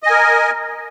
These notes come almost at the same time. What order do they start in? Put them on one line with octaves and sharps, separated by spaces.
D#5 G#5 A#4